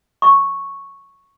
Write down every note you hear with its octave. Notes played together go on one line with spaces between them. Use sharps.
C#6